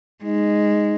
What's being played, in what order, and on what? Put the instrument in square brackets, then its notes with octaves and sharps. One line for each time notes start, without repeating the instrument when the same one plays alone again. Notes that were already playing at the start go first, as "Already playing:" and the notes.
[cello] G#3 [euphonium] D#4